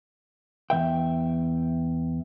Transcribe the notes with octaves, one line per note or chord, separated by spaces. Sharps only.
E2 E3 E5 G5